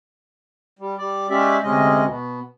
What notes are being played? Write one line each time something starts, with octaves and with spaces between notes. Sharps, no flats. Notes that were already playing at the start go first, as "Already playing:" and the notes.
G3
G3 D5
G#3 C#4 G4 D5 E5
D2 C3 G#3 C#4 D#5
B2